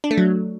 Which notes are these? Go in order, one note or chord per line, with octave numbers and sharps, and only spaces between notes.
D4
A3
F#3